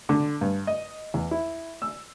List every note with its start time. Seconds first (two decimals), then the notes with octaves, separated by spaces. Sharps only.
0.09 D3
0.41 G2
0.67 D#5
1.14 E2
1.31 E4
1.82 E6